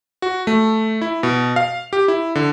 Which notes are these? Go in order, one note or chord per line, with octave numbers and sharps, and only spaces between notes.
F#4
A3
E4
B2
F5
G4
E4
D3